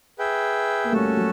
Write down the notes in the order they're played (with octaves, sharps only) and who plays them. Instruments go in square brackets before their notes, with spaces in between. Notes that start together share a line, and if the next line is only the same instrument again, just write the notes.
[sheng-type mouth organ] G#4 B4 E5 G5
[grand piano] A#3
[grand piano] G3 A3 [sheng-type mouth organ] C#4 F#4 A4
[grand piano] A3
F#3